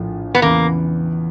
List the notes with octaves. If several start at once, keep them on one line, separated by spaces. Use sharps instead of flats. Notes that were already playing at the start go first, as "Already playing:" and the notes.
Already playing: A#1 A2 F3
B3
E2 C#3 E3 A#3